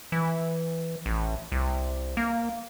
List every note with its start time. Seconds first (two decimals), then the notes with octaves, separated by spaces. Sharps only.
0.12 E3
1.06 A1
1.52 C2
2.17 A#3